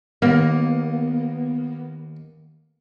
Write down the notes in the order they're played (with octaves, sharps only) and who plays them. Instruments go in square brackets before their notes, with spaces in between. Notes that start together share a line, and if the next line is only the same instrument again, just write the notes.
[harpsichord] D#2 [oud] A#3 [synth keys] B3